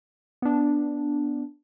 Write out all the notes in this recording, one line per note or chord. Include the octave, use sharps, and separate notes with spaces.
B3 D4